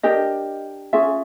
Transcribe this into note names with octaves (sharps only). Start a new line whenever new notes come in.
D4 G4 A#4 D#5
C#4 F4 G#4 E5